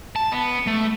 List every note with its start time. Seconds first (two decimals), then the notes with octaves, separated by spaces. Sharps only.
0.16 A5
0.32 B3
0.67 A3